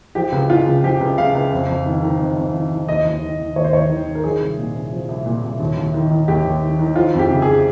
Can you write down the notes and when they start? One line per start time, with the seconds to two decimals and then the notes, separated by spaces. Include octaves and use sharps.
0.15 F3 G4
0.32 C#2
0.50 C#3 F4
0.67 C#2
0.83 F3 G4
1.00 C#2
1.18 C#3 F5
1.35 C#2
1.52 F2
1.69 F2
1.86 D#3
2.03 D#3
2.19 F2
2.37 F2
2.54 D#3
2.71 D#3
2.88 D#2 D#5
3.05 D#2
3.22 D#3
3.40 D#3
3.56 D#2 C#5
3.64 C5
3.73 D#2 C#5
3.89 D#3
4.07 D#3
4.15 A#4
4.24 F3 G#4
4.41 C2
4.58 A#2
4.75 C2
4.93 F3
5.08 C2
5.26 A#2
5.43 C2
5.60 D#2
5.77 D#2
5.94 D#3
6.11 D#3
6.28 D#2 G4
6.45 D#2
6.63 D#3
6.79 D#3
6.96 F3 F4
7.14 F2
7.19 G4
7.30 C#3
7.42 G#4